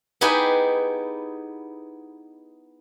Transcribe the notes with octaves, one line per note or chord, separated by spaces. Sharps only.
B3 D#4 E4 G4 G#4 B4